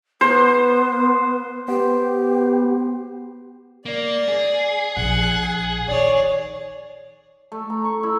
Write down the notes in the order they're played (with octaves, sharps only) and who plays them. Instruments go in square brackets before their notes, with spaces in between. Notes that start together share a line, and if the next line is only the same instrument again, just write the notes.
[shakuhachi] B3 [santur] C5
[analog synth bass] B3 [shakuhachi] G4
[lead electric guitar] A#3 [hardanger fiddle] D5
[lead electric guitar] G#4
[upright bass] A#1 [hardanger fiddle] F#5
[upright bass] D#3 [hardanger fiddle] C#5 D5
[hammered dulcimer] A3
A#5
C#6
E4